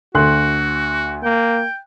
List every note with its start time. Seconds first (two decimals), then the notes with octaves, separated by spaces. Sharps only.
0.15 D2 F#4 C6 F#6
1.23 A#3 G5